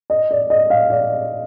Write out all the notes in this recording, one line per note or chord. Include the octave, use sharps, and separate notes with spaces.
D#5
D5
D#5
F5
D5